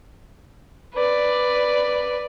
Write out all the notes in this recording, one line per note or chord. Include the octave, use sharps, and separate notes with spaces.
B4 D5